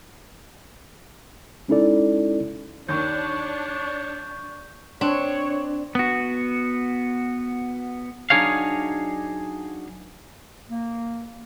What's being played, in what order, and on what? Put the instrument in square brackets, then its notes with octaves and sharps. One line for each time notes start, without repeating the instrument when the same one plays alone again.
[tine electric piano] G#3 C#4 D#4 E4 A4 D5
[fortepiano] D#2 D#3 [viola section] D4 [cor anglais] C#5 [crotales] C#6 G6
[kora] C4 [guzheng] D4 [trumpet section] C#5
[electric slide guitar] B3 F#4
[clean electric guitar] F#3 D4 D#4 G#4 C#5 F5
[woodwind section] A#3